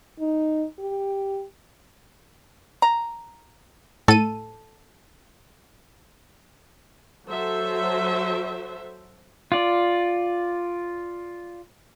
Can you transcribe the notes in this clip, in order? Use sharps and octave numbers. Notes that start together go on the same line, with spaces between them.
D#4
G4
A#5
A2 A4 D#7
F#3 A4 C5 E5
F4 D5